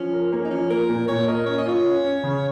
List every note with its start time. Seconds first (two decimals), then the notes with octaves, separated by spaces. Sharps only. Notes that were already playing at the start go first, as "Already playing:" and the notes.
Already playing: F3 C#4
0.14 A#4
0.32 A#3 C#4
0.45 D#4
0.51 F3 C#4
0.70 A#3 A#4
0.89 A#2
1.08 A#2 C#5
1.28 A#4 D#5
1.46 C#4 C#5
1.58 D#5
1.66 F4 C#5
1.86 C#4
2.04 C#4
2.23 C#3